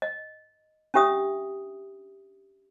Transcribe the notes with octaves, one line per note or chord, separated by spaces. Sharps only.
D#5
C#4 D4 G4 E5 D#6